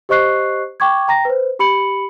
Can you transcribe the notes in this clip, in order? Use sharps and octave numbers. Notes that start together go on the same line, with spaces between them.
G4 C5 D#5 C#6 F#6 C7
G5 C#6 D6 G#6
G5 A#5 A#6
B4 C5
G4 B5 C#7 F#7